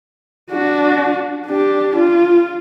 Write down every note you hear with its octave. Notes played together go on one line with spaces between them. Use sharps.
D4 F#4
D4 G4
F4